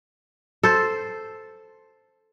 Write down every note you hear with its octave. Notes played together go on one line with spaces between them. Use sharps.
A4 C5